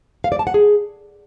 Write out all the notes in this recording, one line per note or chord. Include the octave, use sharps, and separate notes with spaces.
F5
D5
A5
F#5
G#4